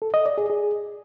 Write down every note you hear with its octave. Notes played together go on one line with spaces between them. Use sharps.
A4
D#5
D5
G#4
G#4